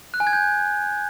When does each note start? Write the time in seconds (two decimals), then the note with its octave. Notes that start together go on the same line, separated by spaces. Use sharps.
0.14 F#6
0.20 G#5
0.27 G#6
0.33 G6